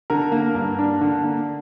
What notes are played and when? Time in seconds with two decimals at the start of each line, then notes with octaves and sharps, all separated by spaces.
0.10 D3 A#4
0.32 A#3
0.55 G2
0.79 D4
1.01 D3
1.23 A#3